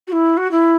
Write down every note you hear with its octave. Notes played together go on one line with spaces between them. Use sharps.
F#4
E4
F#4
E4